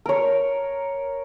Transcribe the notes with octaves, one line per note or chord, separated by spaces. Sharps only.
A#4 C#5